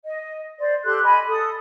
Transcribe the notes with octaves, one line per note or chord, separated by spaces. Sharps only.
D#5
C5 D5
G4 A4 C6 F#6
D#5 G#5 B5
A4 D#6